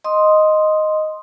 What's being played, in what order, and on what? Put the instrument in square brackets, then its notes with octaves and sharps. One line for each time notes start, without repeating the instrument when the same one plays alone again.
[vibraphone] D#5 C6 D#6